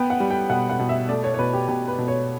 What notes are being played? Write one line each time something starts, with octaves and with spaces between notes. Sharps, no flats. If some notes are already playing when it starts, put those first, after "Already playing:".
Already playing: B3 G5
F#5
G3
G5
B2 F#5
F#5
B2
E5
A3 D5
C#5
C#5
B2 B4
G4
B2 G4
B4
B2
C#5